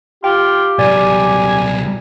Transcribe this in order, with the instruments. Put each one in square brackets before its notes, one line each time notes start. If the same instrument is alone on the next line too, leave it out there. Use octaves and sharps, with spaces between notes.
[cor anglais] F4 [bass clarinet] G4 [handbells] G5
[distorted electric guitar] C2 F#3 [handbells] D5 [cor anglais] G#5